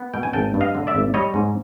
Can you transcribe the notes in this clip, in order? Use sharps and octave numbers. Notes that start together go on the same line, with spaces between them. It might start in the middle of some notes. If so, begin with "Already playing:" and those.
Already playing: B3
B2 G5
G#5
G#1 G5 A5
G2
D#5 F5
D3
D5 E5
G#1
G3 C#5 D#5
G#2